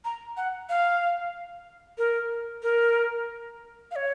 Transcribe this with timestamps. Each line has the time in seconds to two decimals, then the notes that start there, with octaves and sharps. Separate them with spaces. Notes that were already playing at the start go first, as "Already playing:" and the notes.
0.05 A#5
0.37 F#5
0.69 F5
1.98 A#4
2.63 A#4
3.91 F5
3.96 C#5